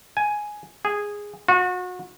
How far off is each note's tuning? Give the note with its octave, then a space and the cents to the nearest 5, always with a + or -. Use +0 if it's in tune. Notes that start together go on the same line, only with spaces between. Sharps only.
G#5 +5
G#4 -10
F#4 -35